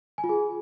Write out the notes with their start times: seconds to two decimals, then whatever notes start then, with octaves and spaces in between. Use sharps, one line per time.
0.18 G#5
0.24 F4
0.29 G#4